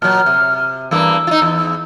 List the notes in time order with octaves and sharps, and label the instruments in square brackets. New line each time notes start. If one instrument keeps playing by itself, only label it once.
[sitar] A#2 F#3 [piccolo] F6
[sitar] C3
[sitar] E2 G2 A#3 [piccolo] E6
[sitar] D#4 F4
E2